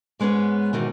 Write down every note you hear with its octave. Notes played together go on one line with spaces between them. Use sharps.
G#2 G#3 B3 C#4 B4
G#2 B2 D#3 E3